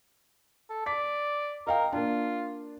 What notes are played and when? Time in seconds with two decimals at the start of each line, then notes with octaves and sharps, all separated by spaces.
0.70 A4
0.86 D5 B6
1.67 A#4 D#5 F5 G5
1.92 A#3 D4 F4